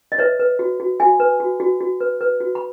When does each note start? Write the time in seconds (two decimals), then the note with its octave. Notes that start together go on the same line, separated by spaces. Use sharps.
0.12 D#5
0.19 B4 C#5 E5
0.39 B4
0.59 F#4
0.80 F#4
1.00 F#4 E5 G#5
1.20 B4
1.40 F#4
1.60 F#4
1.81 F#4
2.01 B4
2.21 B4
2.41 F#4
2.55 B5